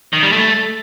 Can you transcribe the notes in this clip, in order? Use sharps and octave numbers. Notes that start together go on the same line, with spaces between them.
D#3
G3
A3